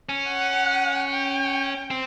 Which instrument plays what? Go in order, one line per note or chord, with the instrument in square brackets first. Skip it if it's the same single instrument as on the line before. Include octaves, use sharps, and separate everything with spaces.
[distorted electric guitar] C#4
[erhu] F#5
G5
[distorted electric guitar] C4